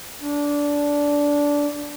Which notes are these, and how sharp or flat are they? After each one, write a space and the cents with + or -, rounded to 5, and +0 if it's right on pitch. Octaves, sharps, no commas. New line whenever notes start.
D4 -15